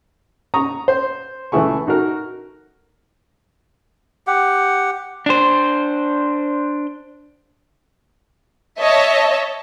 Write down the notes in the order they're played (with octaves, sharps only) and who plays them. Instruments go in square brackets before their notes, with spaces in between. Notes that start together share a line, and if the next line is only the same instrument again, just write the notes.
[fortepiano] A#5 C#6 D#6
C5
C#2 E3 A3 E4 G#4 C#6
D#4 F#4 A4 A#4
[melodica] G4 F#5
[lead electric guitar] D4 C5
[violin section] C#5 D#5 E5 A5